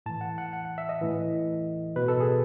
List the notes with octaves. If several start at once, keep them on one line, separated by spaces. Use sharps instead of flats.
A2 E3 A5
F#5
F#5
F#5
F#5
E5
D#5
A2 E3
B2 B4
A4
G#4